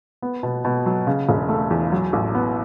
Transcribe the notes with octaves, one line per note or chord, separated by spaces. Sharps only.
B3
B2
B2
F#3
C#3
E1
A3
E2
F#3
A1
B3